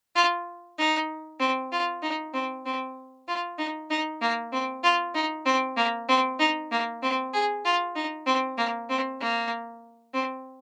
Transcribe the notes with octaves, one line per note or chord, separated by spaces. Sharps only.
F4
D#4
C4
F4
D#4
C4
C4
F4
D#4
D#4
A#3
C4
F4
D#4
C4
A#3
C4
D#4
A#3
C4
G#4
F4
D#4
C4
A#3
C4
A#3
C4